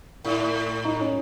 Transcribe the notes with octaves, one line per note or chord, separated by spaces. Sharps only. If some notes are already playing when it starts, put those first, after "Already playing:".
A2 E4
D#4
C#4